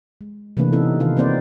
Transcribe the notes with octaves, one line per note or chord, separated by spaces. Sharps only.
G#3
C3 E3 A3 A#3 D4 B4
B3 C#4 D#4 E4 A4
C3 D#3 D#4 F4 B4 F5
A#3 C4 D#4 C5 D5